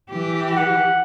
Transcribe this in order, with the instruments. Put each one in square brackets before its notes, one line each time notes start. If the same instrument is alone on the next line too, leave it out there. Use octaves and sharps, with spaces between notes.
[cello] E3 G4
[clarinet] F#5